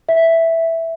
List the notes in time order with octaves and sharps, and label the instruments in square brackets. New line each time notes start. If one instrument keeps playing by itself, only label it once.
[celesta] E5